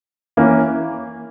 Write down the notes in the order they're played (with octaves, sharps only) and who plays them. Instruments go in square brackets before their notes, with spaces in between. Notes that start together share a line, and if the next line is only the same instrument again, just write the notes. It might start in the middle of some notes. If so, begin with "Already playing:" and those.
[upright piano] E3 A#3 C#4